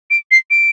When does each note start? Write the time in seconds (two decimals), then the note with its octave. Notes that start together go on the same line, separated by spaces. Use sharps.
0.10 D7
0.31 C7
0.51 D7